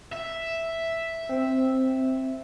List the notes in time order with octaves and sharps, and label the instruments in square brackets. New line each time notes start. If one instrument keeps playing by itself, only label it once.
[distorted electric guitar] E5
[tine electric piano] C4